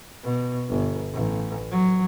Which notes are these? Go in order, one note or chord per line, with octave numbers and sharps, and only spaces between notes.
B2
G1
A1
F#3